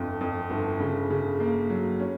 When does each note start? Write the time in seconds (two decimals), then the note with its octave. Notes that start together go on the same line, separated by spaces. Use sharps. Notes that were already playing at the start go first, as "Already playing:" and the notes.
Already playing: G1 F2
0.21 F2
0.50 G1
0.80 C#3
1.10 C#3
1.40 A#3
1.70 F#3
2.00 C#4